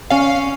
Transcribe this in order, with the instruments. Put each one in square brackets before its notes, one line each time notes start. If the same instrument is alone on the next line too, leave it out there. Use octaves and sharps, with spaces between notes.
[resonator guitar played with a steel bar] C#4 [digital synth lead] F5